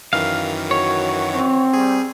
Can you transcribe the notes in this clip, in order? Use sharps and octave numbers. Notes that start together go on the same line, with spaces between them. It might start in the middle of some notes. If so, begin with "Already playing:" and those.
F#2 D#3 E3 F5
F#4 C#5
C4
G3 G#4